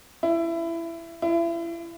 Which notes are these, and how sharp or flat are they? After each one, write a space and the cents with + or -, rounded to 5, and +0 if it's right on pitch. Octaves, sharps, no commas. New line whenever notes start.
E4 +20
E4 +35